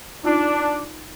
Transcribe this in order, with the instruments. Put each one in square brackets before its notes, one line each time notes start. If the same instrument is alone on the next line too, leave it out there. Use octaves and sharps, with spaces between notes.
[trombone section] D4 [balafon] D#4 F4